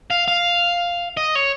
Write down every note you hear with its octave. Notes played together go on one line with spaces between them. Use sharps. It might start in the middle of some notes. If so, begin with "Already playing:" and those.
F5
F5
D#5
C#5